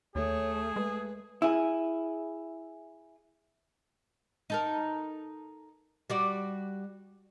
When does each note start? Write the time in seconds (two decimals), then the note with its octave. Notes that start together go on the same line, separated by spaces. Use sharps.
0.15 D#2 A3 G#4 C#5
0.76 G#3 B4
1.42 E4 G#4
4.50 D#4 A4 A#4
6.10 G3 F#4 D5